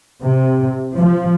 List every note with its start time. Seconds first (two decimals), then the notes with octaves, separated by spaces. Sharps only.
0.22 C3
0.94 F3